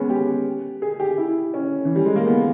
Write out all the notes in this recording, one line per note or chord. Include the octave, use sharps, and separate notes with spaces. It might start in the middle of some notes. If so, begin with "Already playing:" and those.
Already playing: G#3 B3 C#4
G4
G#4
G4
E4
C#4
E3
G3
G#3
A#3
B3